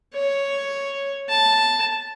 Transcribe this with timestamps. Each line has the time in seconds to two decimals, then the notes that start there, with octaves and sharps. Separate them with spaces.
0.14 C#5
1.29 A5